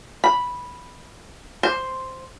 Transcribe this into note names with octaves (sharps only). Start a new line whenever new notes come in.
B5
C5